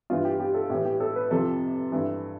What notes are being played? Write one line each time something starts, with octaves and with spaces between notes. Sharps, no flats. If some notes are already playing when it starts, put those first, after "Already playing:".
G2 E3 F4
G4
G4
A4
A2 E3 G4
G4
A4
B4
F2 C3 F3 A4
G2 E3